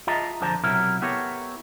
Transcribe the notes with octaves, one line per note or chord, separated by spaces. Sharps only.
F4 G#4 D#5 E5 A5 A#5
F2 D3 F3 C5 A5 A#5
B1 C3 F#3 E4 A#4
B3 E4 G4 A4 A#4 C#5